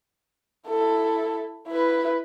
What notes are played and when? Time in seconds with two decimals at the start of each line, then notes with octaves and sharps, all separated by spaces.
0.68 E4 A4
1.68 E4 B4